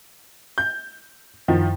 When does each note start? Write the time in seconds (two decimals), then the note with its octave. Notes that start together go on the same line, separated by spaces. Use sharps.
0.58 G6
1.48 F#2 D#3 F3